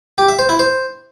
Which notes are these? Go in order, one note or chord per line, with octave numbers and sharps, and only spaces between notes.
G4
E5
C5
E4
C5